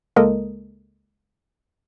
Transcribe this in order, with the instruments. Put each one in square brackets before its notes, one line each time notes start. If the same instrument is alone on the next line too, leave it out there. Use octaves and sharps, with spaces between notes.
[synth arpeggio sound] C#2 G#3 A#3 A4 A#4 D#5